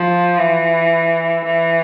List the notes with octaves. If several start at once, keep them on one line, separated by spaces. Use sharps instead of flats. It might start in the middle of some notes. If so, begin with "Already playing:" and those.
Already playing: F3
E3
E3